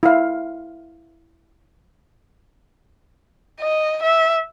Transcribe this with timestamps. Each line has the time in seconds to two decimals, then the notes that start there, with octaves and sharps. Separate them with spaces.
0.03 E4 F5
3.61 D#5
4.03 E5